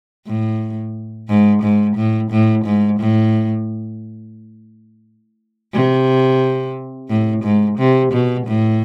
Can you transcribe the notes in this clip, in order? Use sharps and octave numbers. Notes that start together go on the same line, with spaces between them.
A2
G#2
G#2
A2
A2
G#2
A2
C3
A2
G#2
C3
B2
A2